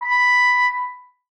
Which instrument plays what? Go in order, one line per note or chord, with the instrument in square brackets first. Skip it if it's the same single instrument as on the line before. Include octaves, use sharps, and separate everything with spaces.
[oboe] B5